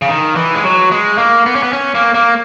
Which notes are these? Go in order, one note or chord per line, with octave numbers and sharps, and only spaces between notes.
C#3
D#3
E3
G#3
F#3
G#3
A#3
B3
C#4
B3
C#4
A#3
A#3